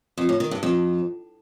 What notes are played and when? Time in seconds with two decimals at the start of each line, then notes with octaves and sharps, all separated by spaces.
0.17 F2
0.29 A2
0.40 D#3
0.51 G2
0.63 F2